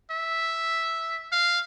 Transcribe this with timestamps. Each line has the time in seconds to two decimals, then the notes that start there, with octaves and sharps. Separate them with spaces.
0.10 E5
1.32 F5